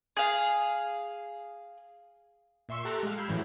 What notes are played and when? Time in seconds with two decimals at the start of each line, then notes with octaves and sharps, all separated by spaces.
0.17 G#4 F5
2.69 A#2 E5 C6 C#6 E6
2.85 G4 A4 A#5 F#6
3.03 G#3 F5
3.16 B5 E6 F6 G6 G#6 C7
3.28 A2 C#3 E3 F#3 E4